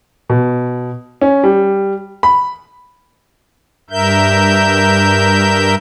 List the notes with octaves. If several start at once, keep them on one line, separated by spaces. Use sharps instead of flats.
B2
C#4
G3
B5
G2 A#4 E5 G6